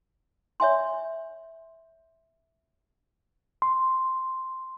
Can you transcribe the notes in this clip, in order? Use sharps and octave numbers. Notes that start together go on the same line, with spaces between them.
C#5 E5 G#5 C6
C6